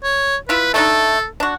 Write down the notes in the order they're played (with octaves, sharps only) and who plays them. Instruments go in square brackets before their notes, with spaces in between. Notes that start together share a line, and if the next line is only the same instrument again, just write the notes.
[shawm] C#5
[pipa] E4 F4 [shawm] B4
[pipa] A3 D4 D#4 [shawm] A4
[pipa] D4 F#4